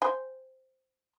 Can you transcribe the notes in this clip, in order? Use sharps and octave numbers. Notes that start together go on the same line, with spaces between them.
C5 G#5